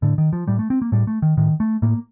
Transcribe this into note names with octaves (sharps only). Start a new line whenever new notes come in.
A2 D3
D#3
F3
A2 G3
A3
C4
A#3
A2 G3
A3
D#3
A2 D#3
A3
A2 A#3